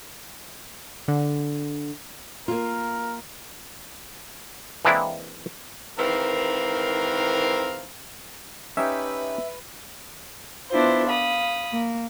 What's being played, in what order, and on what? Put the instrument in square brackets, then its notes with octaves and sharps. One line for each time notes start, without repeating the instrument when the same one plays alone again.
[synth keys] D3
[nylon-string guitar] A#3 F4 [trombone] A#4
[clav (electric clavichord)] E3 G#3 A#3 C4 D4 E4
[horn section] G#2 D#3 E3 C4 A#4 F5
[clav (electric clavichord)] C#4 D#4 G4 [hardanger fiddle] B4 [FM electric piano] E5
[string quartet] B3 D4 E4 F4 C5
F5 B5 D#6
A#3